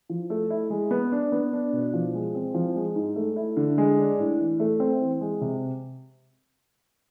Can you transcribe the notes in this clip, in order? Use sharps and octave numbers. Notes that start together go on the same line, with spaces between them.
F3
A3
E4
G#3
B3
D4
B3
D4
B2
F3
G#3
C4
F3
G#3
G#2
A3
E4
D3
G#3
D4
A2
E3
A3
C4
E3
G#3
C3